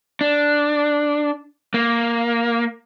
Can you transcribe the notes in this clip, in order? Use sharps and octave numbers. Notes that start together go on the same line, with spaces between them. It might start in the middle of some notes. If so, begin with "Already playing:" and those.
D4
A#3